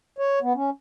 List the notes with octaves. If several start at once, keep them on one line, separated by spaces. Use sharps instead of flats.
C#5
B3
C#4